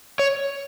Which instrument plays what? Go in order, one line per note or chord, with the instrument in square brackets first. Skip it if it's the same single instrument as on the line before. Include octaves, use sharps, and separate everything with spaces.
[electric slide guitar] C#5